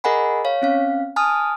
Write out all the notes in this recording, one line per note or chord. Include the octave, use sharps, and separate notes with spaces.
G#4 A#4 D#5 F#5 G#5 B5
C#5 F5
C4 C#4 F5
G#5 A5 D#6 F6